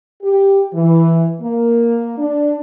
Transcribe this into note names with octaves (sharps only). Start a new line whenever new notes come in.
G4
E3
A#3
D4